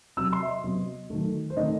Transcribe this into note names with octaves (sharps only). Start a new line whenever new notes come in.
C3 F#3 C4 E6
C6
E5
D#5
C3 F#3 B3
D#3 F#3 A3
C5
D#3 A3 C4 D#5